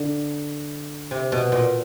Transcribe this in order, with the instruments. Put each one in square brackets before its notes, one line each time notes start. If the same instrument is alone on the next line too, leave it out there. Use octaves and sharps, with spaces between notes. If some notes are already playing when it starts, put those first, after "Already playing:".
Already playing: [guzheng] D3
C3
B2
A#2